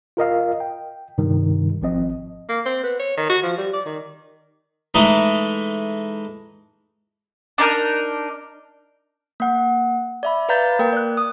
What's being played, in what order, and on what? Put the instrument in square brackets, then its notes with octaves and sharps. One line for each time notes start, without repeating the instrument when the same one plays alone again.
[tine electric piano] F4 A#4 D#5 F5
G5
G2 C3 D#3 G3
G#1 F3 C4 D#5
[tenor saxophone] A#3
C4
B3
C#5
D#3
F#4
F3
G3
D5
D#3
[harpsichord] E3 G#3 A3 D#4
[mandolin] D4 D#4 A#4
[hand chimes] A#3 F#5
D5 E5 B5
B4 D5 F5 A#5 G6 A6
A#3 A#4 G5
D5 F#6
D#6